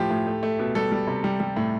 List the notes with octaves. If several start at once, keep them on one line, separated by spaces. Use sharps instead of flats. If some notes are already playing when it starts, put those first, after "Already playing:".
Already playing: A2 F3 G4
A2
A3
A3
B2
G3 A4
G3
C3
G3
G3
A2